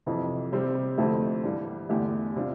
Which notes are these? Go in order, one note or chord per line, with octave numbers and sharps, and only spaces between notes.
F2 C3 E3
C3 G3 C4 G4 C5
F2 D3 A3 C4 E4
G2 E3 G3
E2 D3 A3 E4 G4
C3 G3 D4 F4